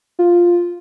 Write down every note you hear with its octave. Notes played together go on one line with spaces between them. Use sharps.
F4